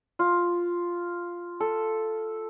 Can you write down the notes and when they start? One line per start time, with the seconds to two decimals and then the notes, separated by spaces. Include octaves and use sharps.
0.19 F4
1.60 A4